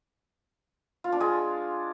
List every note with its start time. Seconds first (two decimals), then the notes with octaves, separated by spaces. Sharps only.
1.04 F4
1.12 D4
1.20 G#3